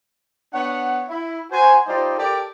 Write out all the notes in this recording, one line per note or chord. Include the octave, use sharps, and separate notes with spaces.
B3 D4 C#5 F#5
E4
F#4 C5 G#5
G3 D#4 F4 C5 D5 D#5
G4 A4 A#4 D5